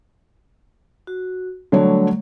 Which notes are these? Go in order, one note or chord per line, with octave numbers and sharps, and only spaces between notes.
F#4
D3 F#3 G3 A3 C#5